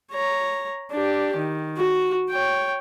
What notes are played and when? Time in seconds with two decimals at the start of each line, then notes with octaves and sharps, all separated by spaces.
0.12 C#5 A#5
0.91 D4 G4
1.37 D#3
1.77 F#4
2.30 C#5 G5